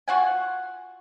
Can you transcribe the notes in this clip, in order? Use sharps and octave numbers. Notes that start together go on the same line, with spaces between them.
F4 F#4 F#5 G#5